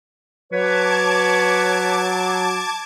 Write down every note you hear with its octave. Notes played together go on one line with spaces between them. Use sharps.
F#3 B4 C#5 A5 D6 G#6